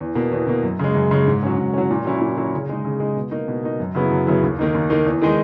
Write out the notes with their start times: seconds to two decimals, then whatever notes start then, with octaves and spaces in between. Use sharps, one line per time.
0.01 E2
0.15 B2 A#3
0.32 E2
0.47 B2 A#3
0.63 F#2
0.79 C#3 G#3
0.94 F#2
1.11 C#3 G#3
1.27 G#2
1.43 F#3 C#4
1.58 G#2
1.73 F#3 C#4
1.90 A#2
2.05 F#3 C#4 E4
2.21 A#2
2.37 F#3 C#4 E4
2.53 C#3
2.69 G#3 D#4
2.85 C#3
3.00 G#3 D#4
3.16 B2
3.31 A#3 D#4
3.48 B2
3.63 A#3 D#4
3.80 F#2
3.95 C#3 F#3 B3 E4
4.11 F#2
4.26 C#3 F#3 B3 E4
4.43 D#2
4.59 D#3 A#3 D#4
4.74 D#2
4.90 D#3 A#3 D#4
5.06 E2
5.22 D#3 G#3 D#4